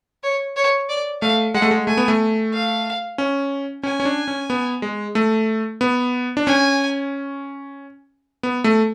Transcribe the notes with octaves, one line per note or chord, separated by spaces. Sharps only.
C#5
C#5
D5
A3 F5
G#3 F#5
A3
G#3
A3 G#5
B3
A3
F5
C#4
C#4 G#5
C#4
D4
C#4
B3
G#3
A3
B3
D4
C#4 G#5
B3
A3